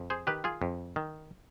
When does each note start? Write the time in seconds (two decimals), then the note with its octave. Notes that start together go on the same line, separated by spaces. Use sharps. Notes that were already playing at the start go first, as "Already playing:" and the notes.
Already playing: F2
0.10 G#4 C5
0.27 D#3 G4 B4
0.44 F4 G#4
0.62 F2
0.96 D#3